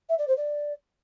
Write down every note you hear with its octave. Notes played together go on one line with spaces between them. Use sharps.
E5
D5
C5
D5